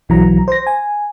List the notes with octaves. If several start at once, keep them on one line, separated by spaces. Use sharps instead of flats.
B1 E3 F#3 A#5
C5 A#6
G#5